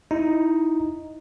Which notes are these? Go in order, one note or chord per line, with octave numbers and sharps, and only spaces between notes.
D#4 E4